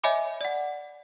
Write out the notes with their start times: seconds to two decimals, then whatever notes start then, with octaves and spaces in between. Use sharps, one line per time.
0.04 C#5 D#5 E5 G#5 B5 D6
0.41 D5 F#5